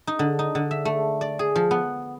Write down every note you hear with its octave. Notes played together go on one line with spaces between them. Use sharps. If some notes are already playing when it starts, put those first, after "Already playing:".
D#4
D3
D#4
D3
E5
A3
D5
G#4
F3
B3